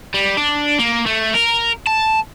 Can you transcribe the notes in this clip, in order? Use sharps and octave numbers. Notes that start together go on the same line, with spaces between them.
G3
D4
A#3
A3
A#4
A5